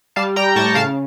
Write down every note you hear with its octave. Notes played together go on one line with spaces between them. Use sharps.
G3 F5 A5
G3 G5 A#5
A2 A5 C#6
C#3 F5 A5